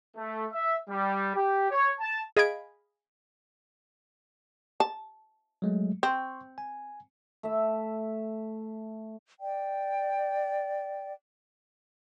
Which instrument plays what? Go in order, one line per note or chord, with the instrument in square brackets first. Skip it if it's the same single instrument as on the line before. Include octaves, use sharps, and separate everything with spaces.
[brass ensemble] A3
E5
G3
G4
C#5
A5
[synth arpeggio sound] G#4 D#5 F5 B5 G#6 D7
[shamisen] A5
[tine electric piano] F#3 G#3 A3
[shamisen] C4 [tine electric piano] C6 C#6
[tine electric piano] G#5
[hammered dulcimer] A3 E5
[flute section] D5 G5